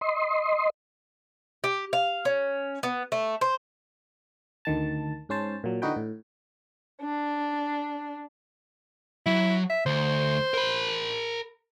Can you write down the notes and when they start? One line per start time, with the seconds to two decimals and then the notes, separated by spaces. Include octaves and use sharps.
0.01 D#5 C6
1.64 G4
1.93 F5
2.25 C#4
2.83 B3
3.12 A3
3.41 C5
4.65 D2 D#3 A5
5.29 G#2 C#4 C5 A5
5.64 A#2 F#3
5.82 D3 E3 D#4 F#4 B4 G5
5.96 A2
7.02 D4
9.26 F#3 E4
9.70 E5
9.86 D2 C5
10.54 A#4 B5